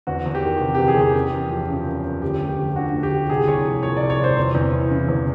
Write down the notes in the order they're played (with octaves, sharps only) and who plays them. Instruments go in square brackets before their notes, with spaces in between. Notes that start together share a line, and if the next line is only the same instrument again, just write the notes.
[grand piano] E2 F#4
E2
G4
D#3
C3
E2 G4
G#4
E2 G4
F#2
F#2
F3
C#3
F#2
F#2
D2 G4
D2
G4
F3
D3 F#4
D2
G4
D2
C2 G#4
C2 C#5
F3
A#2 C#5
D5
C2
C#5
C2 C5
E2
E2
E3
C#3
E2